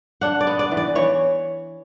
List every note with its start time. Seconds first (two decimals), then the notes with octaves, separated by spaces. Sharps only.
0.21 D4 F#5
0.41 D5
0.47 B3
0.59 D5
0.71 E3
0.77 D5
0.95 E3 C#5